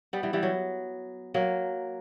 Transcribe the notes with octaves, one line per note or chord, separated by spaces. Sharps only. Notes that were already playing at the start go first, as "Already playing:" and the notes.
G3 B3
E3 G3
E3 G3
F#3
F#3 A#3